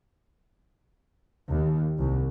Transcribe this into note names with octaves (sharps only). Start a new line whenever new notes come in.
D#2
C2